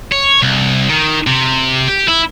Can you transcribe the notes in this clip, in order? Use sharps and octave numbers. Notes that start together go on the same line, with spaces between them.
C#5
C2
D#3
C3
G4
E4